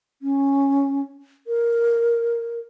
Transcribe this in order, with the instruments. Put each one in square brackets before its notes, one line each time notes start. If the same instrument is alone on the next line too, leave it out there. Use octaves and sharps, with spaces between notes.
[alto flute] C#4
A#4